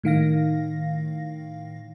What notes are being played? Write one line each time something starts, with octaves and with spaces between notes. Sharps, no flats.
A2 D#3 F5 A#6